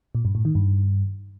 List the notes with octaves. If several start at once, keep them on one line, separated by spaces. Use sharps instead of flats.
A#2
G2
A2
D#3
G2